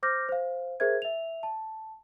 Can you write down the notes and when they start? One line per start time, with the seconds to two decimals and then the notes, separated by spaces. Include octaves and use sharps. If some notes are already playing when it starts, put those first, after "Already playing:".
0.03 C5 D6 F6 G6 A#6
0.29 C5 F5
0.80 G#4 A#4 C5 E5 G#6
1.02 E5 F7
1.43 A5